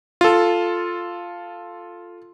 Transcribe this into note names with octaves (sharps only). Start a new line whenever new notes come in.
F4 A4